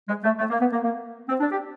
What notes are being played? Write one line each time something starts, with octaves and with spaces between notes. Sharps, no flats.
G#3
A3
A3
A#3
B3
A#3
A#3
C4
D4
G4